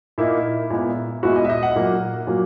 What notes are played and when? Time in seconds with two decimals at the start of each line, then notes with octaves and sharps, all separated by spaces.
0.18 A#2 A#3 D#4 E4
0.70 A#2 G#3 B3 E4
1.23 A#2 G#3 B3 E4 F#4
1.36 D#5
1.45 E5
1.50 D#5
1.63 F#5
1.76 A#2 F#3 A#3
2.27 A#2 F#3 A#3